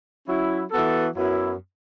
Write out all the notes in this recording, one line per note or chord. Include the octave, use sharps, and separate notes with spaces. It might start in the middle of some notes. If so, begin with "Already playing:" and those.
F#3 C#4 E4
E3 B3 F#4 A4
F#2 F#3 B3 E4